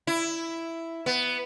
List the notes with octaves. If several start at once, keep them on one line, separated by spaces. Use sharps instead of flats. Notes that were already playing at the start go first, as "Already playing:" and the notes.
E4
B3